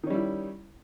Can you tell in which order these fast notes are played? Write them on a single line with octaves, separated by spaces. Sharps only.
D#3 C#4 G3 E4